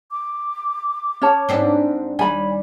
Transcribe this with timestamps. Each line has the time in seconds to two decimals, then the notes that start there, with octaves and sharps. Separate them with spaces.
0.11 D6
1.22 C#4 C#5 A5
1.49 G#2 C4 D4
2.19 D#2 G3 G#5 B5